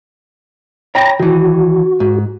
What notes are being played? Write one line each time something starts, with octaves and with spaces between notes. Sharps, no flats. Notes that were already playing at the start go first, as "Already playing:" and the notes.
C#5 G5 A#5 B5 A#6
D#3 E3 F#4
G#2